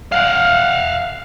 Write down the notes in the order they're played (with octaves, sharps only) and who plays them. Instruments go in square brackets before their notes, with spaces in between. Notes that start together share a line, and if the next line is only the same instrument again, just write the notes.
[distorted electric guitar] F5 F#5